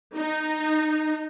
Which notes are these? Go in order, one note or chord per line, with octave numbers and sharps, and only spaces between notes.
D#4